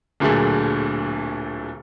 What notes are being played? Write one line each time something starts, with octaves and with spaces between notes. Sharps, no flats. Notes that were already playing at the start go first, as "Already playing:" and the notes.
D1 A#2 D3 F#3 A3 G#4